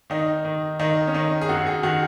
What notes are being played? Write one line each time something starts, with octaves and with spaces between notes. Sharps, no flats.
D#3 D#4
D#3
D#3 D#4
C#4
D#3 D#4
G#4
F#2 F#4
G#4
D#3 F#4